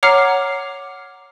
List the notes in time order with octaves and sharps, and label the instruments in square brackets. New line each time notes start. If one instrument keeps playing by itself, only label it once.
[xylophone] C#5 F#5 A#5 D6 F6 C7